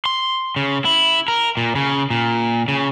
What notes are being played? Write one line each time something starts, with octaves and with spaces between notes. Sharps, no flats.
C6
C#3
E4
A#4
A#2
C#3
A#2
C#3